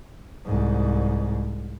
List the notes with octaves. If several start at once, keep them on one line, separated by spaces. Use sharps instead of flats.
C2 G#2